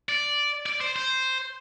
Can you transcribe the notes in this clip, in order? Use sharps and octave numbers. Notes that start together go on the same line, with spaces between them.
D5
D5
C5
C5